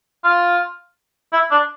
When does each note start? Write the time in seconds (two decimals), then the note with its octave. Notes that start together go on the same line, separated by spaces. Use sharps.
0.24 F4
1.33 E4
1.51 D4